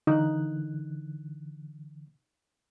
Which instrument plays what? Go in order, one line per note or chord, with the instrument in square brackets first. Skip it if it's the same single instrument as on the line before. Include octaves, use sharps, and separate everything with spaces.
[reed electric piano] D3 E3 F#6 [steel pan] D#4